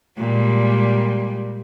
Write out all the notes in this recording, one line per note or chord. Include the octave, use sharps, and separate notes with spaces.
A#2 G3 G#3